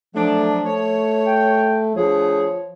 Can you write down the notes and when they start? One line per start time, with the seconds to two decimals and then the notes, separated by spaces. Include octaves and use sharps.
0.15 F3 F#3 A3 D4
0.66 A3 C#5
1.26 G5
1.96 D2 F3 G#4 C#5